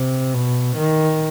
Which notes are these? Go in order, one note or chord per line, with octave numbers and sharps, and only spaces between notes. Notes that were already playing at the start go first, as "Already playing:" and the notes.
Already playing: C3
B2
D#3